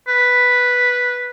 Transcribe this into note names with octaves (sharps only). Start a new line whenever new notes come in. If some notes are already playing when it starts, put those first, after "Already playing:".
B4